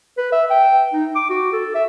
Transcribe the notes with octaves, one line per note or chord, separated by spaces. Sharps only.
B4
E5
G5
D#4
D6
F#4
A4
E5